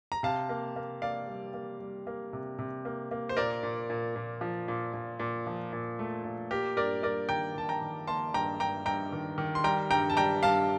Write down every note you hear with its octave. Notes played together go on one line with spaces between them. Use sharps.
A#5
C3 F5 A5
A#3
A#3
A#3 D5 F5
G3
A#3
G3
A#3
C3
C3
A#3
A#3
C5
A#2 A#4 D5
A#2
A#2
A#2
F3
A#2
A#2
A#2
F3
A#2
A3
A#2
A#3 G4 A#4
G2 A#4 D5
G2 A#4 D5
D#3 G5 A#5
D#3 A5
G5 A#5
D#3
A#3 A5 C6
G2 G5 A#5
G2 G5 A#5
G2 G5 A#5
D#3
D#3
C6
G3 G5 A#5
G2 G5 A#5
A5
G3 G5 A#5
G2 F5 A5